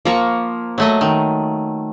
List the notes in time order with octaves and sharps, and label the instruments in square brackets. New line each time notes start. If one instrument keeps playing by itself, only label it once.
[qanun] F3 A#3 C#6
[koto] F#3 A3 D#5
D#3